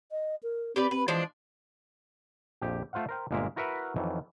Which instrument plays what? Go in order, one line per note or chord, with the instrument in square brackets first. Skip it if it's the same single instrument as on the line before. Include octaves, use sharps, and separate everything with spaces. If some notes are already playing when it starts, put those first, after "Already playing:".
[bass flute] D#5
A#4
[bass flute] C4 [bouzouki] G4 B4 D5
[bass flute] C4 [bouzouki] B4
[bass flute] E3 [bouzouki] F3 G#3 D4
[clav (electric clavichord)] A#1 F2 G4
A3 F4 C5 F5 F#5
A#4 C5 G5
G1 A#2 G#3 A#3 A#4 E5
E4 F#4 A#4 B4 E5 F#5
F2 D#3 E3 F#3